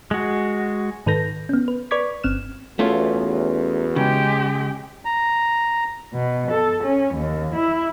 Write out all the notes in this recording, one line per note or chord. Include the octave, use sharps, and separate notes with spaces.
G#3 F#4
G#2 D#3 A4 B4 G6 A#6
B3 C#4
B4
B4 D5 C#6 D6 G#6 B6
G1 C4 F6 E7
E2 A3 C#4 F4 F#4
C#3 G#3 G4
A#5
B2
A4
C#4
D#2
E4